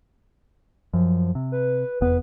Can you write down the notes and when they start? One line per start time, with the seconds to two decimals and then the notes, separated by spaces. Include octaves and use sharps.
0.94 F#2 F3
1.35 C3
1.52 B4
2.01 F1 E2 B3 B4